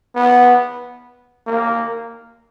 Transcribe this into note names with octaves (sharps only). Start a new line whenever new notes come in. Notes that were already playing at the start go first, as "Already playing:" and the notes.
B3
A#3